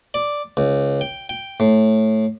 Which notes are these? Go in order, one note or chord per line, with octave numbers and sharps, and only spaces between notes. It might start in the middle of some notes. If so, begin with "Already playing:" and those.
D5
C#2
G5
G5
A2